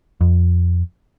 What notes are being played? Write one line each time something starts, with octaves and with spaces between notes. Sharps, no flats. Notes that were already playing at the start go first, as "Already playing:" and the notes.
F2